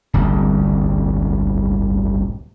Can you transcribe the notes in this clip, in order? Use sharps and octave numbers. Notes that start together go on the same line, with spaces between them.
D1 G1 C2